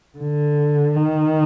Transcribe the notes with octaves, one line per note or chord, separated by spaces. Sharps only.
D3
D#3